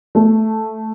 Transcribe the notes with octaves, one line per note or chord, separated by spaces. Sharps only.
A3